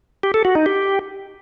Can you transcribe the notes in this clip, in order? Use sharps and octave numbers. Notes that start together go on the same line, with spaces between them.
G4
A4
F#4
D#4
G4